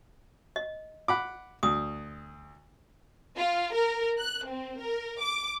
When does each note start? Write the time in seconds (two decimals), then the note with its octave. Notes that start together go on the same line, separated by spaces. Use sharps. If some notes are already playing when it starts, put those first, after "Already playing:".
0.56 D#5
1.08 F#5 B5 D6
1.63 D2 D#6
3.37 F4
3.74 A#4
4.18 F#6
4.47 C4
4.80 A#4
5.21 D6